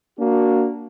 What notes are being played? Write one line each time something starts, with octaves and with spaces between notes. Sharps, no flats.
A#3 D4 F#4